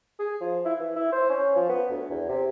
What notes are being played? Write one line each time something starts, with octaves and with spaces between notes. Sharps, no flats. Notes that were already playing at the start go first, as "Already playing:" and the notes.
G#4
F3
E4
E3
E4
C5
C#4
F3
B3
D2
E2
C3